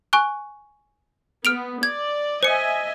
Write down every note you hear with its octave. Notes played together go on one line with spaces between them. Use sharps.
G#5 C#6 F#6
B3 F6 D7 F7
D5 G#6
C5 D#5 E5 G#5 C#7